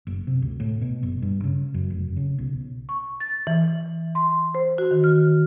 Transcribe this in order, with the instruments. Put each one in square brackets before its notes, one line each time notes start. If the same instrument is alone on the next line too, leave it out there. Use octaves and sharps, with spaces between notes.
[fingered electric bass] F#1
C3
D2
A2
B2
F#1
G2
C#3
F#2
F1
C#3
B1
[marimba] C#6
A6
E3
C6
C5
F#4
D#3
F6